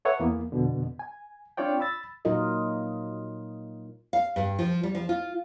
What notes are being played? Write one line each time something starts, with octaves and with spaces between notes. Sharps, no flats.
A4 B4 C#5 E5 F#5
E2 E3 A#3 B3
F2 B2 D3
G#5
C4 D4 F4 C#5 D5 G5
B5 E6 A6
A#2 F#3 D#4 F4 A#4 D#5
F5
G2
F3
G3
F3
F4